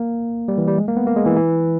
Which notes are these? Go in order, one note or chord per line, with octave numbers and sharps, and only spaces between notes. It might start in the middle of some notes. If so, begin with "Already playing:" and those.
Already playing: A#3
G3
E3
G3
G#3
A#3
B3
A#3
G#3
E3
E3